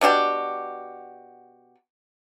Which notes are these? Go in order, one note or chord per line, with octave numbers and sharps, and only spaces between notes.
B2 D4 F#4 G4